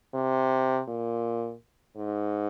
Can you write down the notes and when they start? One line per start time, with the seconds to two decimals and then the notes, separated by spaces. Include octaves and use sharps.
0.14 C3
0.88 A#2
1.96 G#2